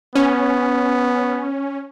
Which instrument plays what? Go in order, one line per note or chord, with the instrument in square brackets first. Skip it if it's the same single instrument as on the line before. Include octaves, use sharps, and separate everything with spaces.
[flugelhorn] B3 [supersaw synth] C#4